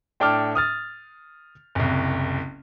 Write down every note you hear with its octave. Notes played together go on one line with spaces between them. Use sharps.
A2 D4 G5 A5 D6 F6
D#6 F6 A6
F#1 C2